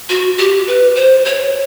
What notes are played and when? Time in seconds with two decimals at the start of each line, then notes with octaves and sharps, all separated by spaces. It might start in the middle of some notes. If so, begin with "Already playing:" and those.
0.09 F#4
0.38 G4
0.67 B4
0.96 C5
1.25 C#5